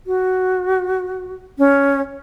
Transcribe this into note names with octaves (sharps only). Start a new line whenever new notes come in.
F#4
C#4